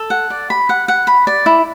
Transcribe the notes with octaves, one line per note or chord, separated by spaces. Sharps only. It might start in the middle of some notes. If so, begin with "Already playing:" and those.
Already playing: A4
F#5
D5
B5
F#5
F#5
B5
D5
E4